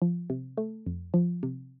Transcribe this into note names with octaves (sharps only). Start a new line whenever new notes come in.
F3
C3
A3
F2
F3
C3